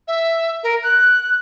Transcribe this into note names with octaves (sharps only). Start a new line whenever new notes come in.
E5
A#4
F#6